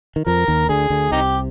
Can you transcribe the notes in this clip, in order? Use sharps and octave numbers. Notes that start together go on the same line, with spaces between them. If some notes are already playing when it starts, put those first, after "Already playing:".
D#3
F2 F3 A#4
D#2 D#3
D2 D3 G#4
D2 D3
C2 C3 D#4 G4